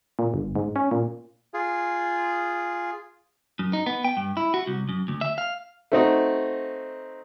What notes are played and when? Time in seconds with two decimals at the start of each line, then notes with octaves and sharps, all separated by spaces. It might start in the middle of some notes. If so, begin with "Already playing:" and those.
0.19 A#2
0.34 G1
0.55 G#2
0.76 C#4
0.91 A#2
1.54 F4 G#4
3.59 F#2
3.73 D#4
3.86 B3
4.05 G5
4.17 G2
4.37 E4
4.54 F#4
4.67 C2
4.89 F#2
5.08 D2
5.21 E5
5.38 F5
5.92 A3 C4 D#4 F#4